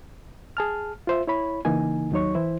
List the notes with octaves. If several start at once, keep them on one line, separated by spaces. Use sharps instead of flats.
G#4 A5 F6
F4 C5 E5
E4 C#5 B5
C#3 E3 A#3 D#4 G#5
D#2 F#3 D#4 C#5 C#6
E3 E4 C5